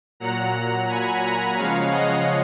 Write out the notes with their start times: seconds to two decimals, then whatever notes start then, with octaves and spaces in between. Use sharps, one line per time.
0.20 A#2 F#3 F#5 A#5
0.89 G#5 B5
1.23 F#5 A#5
1.57 C#3 F3 G#3 C#5 F5
1.91 D#5 F#5